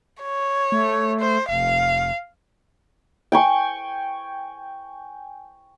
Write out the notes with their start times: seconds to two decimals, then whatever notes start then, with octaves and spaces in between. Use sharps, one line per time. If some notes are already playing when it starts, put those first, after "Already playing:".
0.23 C#5
0.72 A3
1.20 C5
1.49 F1 F5
3.32 G5 G#5 C#6